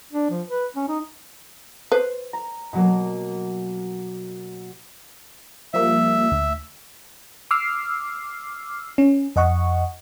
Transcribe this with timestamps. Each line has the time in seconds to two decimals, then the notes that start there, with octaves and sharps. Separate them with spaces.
0.13 D4
0.31 F3
0.48 B4
0.76 C#4
0.88 D#4
1.92 B4 C5
2.33 A#5
2.73 B2 F#3 A#3
5.74 F3 G3 A#3 E5
6.31 D2
7.51 D6 E6 F6 C7
8.98 C#4
9.36 F2 D#5 F#5 C#6